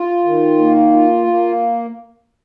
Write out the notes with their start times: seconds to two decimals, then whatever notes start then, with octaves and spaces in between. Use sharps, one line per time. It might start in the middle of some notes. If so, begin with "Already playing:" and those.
Already playing: F4
0.24 D#3
0.58 A#3
0.92 F4
1.27 A#3